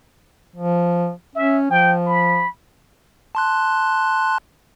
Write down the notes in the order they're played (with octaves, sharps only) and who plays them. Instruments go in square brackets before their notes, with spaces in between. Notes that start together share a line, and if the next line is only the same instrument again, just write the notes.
[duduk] F3
[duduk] C#4 [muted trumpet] E5
[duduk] F3 [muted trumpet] G5
[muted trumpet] B5
[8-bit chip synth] A5 C6 F#6